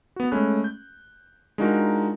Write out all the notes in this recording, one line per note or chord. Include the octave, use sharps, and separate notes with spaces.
B3 F#4
G#3 A3 C#4 B5 F#6
G6
G#3 D4 D#4 F4 F#4 A#4